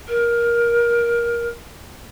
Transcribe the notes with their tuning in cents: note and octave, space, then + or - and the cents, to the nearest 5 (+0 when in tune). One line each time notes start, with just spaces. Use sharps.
A#4 +15